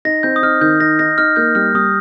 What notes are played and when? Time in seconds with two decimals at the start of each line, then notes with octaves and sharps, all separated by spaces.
0.05 D#4 A#6
0.23 C4 G6
0.36 D#6
0.43 D#4 F6
0.61 D#3 G6
0.80 D#4 A#6
0.99 D#4 A#6
1.18 D#4 F6
1.36 A#3 G6
1.55 G3 F6
1.75 G3 D#6